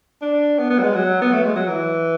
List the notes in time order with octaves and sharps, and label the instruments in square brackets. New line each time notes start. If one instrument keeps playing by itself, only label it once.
[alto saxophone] D4
B3
B3
F#3
G#3
F#3
B3
A3
G#3
F#3
E3